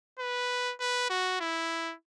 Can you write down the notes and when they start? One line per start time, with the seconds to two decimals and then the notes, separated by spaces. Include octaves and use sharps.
0.19 B4
0.80 B4
1.10 F#4
1.40 E4